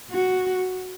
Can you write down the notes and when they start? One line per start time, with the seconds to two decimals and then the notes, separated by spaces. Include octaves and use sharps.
0.11 F#4